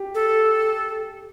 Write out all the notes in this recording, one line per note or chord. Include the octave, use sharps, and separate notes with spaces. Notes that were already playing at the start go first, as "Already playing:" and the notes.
Already playing: G4
A4